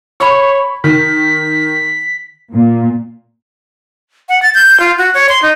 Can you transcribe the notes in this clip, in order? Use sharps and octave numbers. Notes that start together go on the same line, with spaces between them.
C#5 B5 C#6
D#3 B6
A#2
F#5
A6
G6
F4
F#4
C#5
C6
D#4